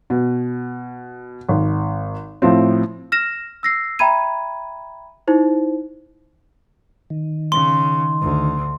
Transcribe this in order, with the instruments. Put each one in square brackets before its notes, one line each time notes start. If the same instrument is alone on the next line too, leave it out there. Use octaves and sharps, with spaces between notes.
[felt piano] B2
G#1
A2 F3 C4
[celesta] F6 A#6 E7
E6 A#6 C7
E5 G5 A#5 B5 G#6 D#7
D#4 E4 C5
[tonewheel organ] D#3
[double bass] C#3 [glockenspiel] C6
[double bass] D2